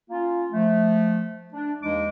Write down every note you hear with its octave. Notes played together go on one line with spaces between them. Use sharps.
A#3 C#4 F4
F3 A3
D4
D#2 E3 G#3 D#4 D6